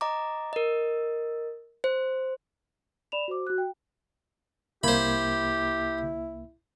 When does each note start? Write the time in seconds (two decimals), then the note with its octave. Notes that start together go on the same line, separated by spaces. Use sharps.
0.01 D#5 A#5 D6
0.53 A#4 D#5
1.84 C5
3.12 D5 B5 E7 F7
3.28 F#4 C5 D6
3.47 F#4 F#6
3.58 G5
4.84 C2 A#3 E4 G4 C5 B5 G#6